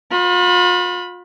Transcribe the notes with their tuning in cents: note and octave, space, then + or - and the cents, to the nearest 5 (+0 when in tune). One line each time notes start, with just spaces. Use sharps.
F4 +40 B5 +0